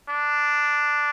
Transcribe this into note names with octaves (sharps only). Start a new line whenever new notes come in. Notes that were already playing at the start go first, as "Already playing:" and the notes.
D4